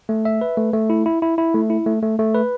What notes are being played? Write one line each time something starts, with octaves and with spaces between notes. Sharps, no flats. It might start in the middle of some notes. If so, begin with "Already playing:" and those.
A3
E5
B4
A3
A3
E4
E4
E4
E4
A3
E4
A3
A3
A3
B4